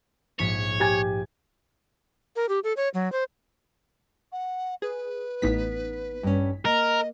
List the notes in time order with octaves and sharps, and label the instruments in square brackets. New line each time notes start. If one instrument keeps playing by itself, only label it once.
[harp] A#1 G#2 B6 [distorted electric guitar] C#5
[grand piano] G4 G#5 G#6
[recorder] A#4
G4
A4
C#5
F#3
C5
[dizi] F#5
[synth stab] G#4 [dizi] B4
[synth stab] A1 D#4 B6 [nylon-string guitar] B3
[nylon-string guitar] G2 C#4
[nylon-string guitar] A#3 [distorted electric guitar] A#4 [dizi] D#5